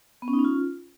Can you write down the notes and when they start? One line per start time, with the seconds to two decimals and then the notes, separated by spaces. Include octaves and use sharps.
0.22 B3
0.28 C#4
0.33 D#4
0.39 C#4
0.45 F4